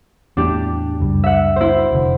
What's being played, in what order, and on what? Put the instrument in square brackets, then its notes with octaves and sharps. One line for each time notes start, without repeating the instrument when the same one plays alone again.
[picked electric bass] E2 A2 [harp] D4 G4
[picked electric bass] F#1 C#2 G3
[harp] E5 F#5
E4 C5
[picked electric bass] F1 D3